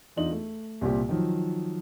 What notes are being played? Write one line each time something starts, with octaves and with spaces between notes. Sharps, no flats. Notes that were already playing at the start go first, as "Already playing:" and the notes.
E2 D4 D#4 F4 D#5 F#7
A3
C2 A#2 C4 G4
D#3 F3 F#3